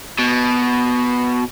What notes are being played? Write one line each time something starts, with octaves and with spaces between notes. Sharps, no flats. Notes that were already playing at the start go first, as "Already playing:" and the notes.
B2